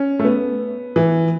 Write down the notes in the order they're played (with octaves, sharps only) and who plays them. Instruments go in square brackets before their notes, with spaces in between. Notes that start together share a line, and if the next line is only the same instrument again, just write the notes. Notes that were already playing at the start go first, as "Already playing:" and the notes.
Already playing: [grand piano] C#4
A3
B3
E3